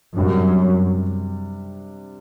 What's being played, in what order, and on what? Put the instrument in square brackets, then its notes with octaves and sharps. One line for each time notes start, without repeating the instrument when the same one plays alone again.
[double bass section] F#2 [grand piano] C3 G3 D4